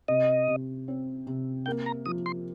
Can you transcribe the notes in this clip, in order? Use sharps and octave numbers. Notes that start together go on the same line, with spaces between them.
C3 D#5
C3
C4
C3
A#3 G5
A#5
F3 D#6
C6